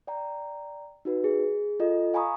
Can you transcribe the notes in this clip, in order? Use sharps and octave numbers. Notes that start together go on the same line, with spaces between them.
D5 G5 A#5
D#4 F#4 B4
G#4
F4 A4 D#5
F5 G#5 A#5 B5 C#6 D#6